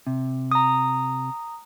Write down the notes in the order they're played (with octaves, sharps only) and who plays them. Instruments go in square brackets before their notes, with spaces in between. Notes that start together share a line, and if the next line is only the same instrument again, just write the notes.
[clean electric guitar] C3
[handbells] A#5 D#6